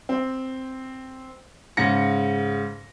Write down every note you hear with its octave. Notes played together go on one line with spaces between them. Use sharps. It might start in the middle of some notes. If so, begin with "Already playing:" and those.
C4
G#2 C#3 A#6 C#7